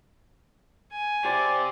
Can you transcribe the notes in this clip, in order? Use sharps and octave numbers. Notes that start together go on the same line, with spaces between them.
G#5
G4 C5 D5